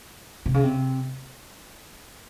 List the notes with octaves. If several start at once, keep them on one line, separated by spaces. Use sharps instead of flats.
C3
C#3
C3